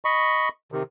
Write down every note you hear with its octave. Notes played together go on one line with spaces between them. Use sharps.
D#5 B5 C#6
C3 D#3